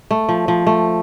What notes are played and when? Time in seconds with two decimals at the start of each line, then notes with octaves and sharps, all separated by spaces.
0.11 A3
0.29 F3
0.48 F3
0.67 A3